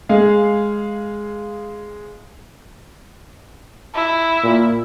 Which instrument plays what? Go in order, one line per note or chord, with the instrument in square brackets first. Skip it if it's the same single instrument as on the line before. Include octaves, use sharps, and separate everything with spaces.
[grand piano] G#3 G#4 F5
[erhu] E4
[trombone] A#2